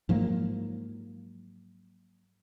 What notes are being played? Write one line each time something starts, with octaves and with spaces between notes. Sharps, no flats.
G#2 F3 F#3 A#3